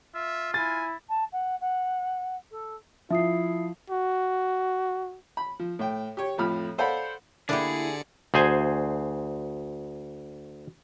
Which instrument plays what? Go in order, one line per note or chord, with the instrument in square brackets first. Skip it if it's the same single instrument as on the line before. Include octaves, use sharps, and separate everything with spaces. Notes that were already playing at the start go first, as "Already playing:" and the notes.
[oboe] F4 [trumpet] E5
[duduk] E4 [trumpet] G#5 [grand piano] A6
[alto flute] A5
F#5
F#5
A4
[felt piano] F3 [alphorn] E4 [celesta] E5 D#6 C7
[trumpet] F#4
[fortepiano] B5
F3
A2 G5
G4 C#5
F2 A2 F3 B5 F6
A4 C5 D5 F5 F#5 B5
[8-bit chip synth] D3 D5 C#7 [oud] A#3 E4 [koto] D4 G4 [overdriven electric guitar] G#4
[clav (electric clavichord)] D2 G#4 C5 G#5